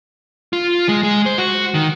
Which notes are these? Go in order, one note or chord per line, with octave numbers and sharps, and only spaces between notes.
F4
G#3
G#3
C5
F#4
D#3